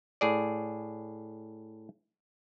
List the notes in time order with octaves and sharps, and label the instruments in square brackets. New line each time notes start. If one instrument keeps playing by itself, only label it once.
[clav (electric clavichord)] A2 G#4 D5